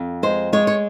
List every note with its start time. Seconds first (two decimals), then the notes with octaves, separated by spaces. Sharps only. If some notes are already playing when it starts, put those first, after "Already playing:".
Already playing: F2
0.23 G#3 C5
0.53 G#3 C#5
0.67 C#5